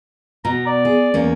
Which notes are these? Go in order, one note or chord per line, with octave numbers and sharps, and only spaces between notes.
B2 A#5
D5
G#4
E2 A#3 C#4